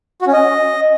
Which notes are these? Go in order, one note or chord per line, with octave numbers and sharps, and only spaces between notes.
F#4
C#4
D#5